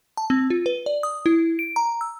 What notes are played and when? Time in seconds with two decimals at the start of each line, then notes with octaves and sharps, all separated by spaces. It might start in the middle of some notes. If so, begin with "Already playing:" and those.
0.17 A5
0.30 C4
0.50 F4
0.66 B4
0.86 D5
1.03 D#6
1.26 E4
1.59 D7
1.76 A#5
2.01 E6